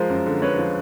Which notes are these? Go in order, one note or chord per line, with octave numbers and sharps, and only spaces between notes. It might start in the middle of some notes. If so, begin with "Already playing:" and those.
Already playing: F3 G#3 A#4 C5
F#2
D3
G#3 B4 C#5
F3